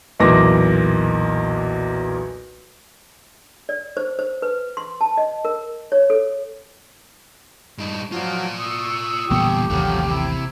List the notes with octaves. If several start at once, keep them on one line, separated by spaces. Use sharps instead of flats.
B1 E2 A#2 D6 A#6
D5
C5
C5
B4
C6
A5
D#5
A#4
C#5
A4
G2 D#4
F3 F#3 F4 F#4 D5
C#6 D#6 E6
E1 A#2 D3 G3 B3 G4
A1 D#2 C3 F3 F#3 A3
C3 E4